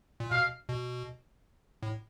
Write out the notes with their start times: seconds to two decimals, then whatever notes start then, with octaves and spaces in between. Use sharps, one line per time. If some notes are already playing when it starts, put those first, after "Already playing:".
0.20 A#2
0.31 B2 F5
0.69 B2
1.83 A2